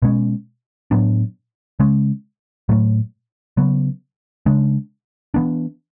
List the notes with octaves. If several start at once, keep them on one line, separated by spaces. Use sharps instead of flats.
B2 G#3 C#4
A2 F#3 B3 D4
C#3 G#3 C#4
A2 F#3 A3
C#3 F#3 B3
C#3 G#3 D4
E3 B3 D4